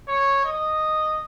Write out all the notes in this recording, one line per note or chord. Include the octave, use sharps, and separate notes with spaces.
C#5
D#5